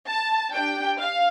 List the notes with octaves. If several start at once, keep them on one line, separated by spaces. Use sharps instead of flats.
A5
D4 G4 G5
F5